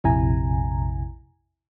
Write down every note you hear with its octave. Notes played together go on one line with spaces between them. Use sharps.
A#1 F2 C3 E4 G#5 A#5